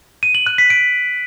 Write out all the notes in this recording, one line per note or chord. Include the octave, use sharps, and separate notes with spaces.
D#7
F#7
F#6
B6
D7